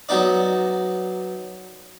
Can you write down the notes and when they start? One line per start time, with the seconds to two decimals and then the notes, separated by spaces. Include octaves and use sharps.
0.09 F#3 B3 D#4 D5